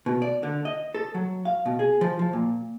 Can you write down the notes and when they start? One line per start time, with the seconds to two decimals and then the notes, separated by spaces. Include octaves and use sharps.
0.06 B2
0.22 D5
0.43 D3
0.65 D#5
0.95 A4
1.15 F#3
1.45 F5
1.66 B2
1.79 G#4
2.01 F3
2.19 F3
2.33 A#2